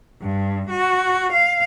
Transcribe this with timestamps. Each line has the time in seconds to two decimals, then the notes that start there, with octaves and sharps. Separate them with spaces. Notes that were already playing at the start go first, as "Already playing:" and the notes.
0.21 G2
0.69 F#4
1.32 F5